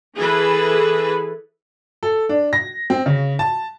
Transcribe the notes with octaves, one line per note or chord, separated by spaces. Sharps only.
E3 G#4 A4 B4
A4
D4
A#6
C4
C#3
A5